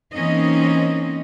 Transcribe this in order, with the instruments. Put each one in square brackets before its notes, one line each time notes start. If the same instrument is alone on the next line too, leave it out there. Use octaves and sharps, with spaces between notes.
[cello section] E3 A#3 C4 C#4 D#4 D#5